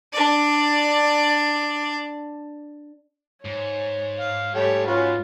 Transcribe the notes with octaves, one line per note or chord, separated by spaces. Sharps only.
D4 D5
G#2 C#5
F5
G3 A3 C#5 G5
C#4 F4 F#4 B4